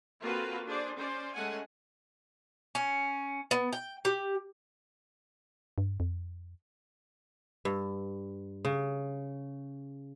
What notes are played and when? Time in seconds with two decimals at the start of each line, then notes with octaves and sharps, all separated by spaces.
0.20 A#3 C4 F4 F#4 A4 B4
0.65 D4 G#4 C5 D5
0.95 C#4 C5 D5
1.33 G#3 A3 C#4 F#5 G#5
2.75 C#4
3.51 B3
3.73 G5
4.05 G4
5.78 G2
6.00 F2
7.65 G2
8.65 C#3